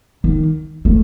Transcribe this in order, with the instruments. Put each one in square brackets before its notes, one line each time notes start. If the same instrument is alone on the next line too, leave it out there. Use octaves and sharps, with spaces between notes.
[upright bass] D#3
A3